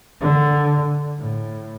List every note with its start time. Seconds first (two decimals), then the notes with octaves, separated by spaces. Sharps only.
0.21 D3
1.18 A2